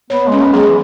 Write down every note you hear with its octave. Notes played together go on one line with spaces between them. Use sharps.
B3 C#5
G#3 C#4
B3
F#3 G#4
G#3
E3